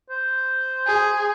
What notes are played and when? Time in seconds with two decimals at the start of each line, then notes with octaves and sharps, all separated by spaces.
0.10 C5
0.87 G#4